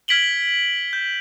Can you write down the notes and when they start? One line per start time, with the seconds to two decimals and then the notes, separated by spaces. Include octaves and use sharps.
0.08 F6 G#6 B6 D7 F#7 G7
0.93 G6